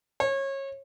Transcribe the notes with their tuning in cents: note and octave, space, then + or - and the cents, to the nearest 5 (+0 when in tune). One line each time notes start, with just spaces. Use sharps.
C#5 -25